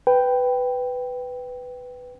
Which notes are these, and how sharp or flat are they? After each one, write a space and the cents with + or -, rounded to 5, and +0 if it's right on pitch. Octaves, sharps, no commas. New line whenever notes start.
B4 +10 G5 +0